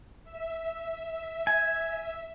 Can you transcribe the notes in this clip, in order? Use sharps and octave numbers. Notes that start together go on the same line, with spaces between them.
E5
G#5